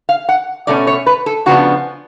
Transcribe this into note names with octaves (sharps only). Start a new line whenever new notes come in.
F5
F#5
B2 A3 C#4 D5
C#5
B4
A4
C#3 F3 B3 D4 F#4